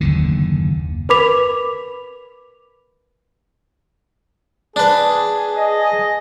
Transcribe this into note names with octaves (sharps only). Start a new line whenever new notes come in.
F#1 D#2 D3
A#4 B4 B5 D6 B6 F7
D4 G#4 B4
D#5